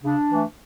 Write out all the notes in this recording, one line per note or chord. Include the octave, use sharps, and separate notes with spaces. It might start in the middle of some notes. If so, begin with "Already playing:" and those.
C#3 D4
E3 A3